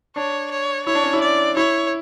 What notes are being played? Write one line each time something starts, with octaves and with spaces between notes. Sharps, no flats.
D4 C#5
C#5
E4 C#5
D4
C#4
E4
D5
E4 C#5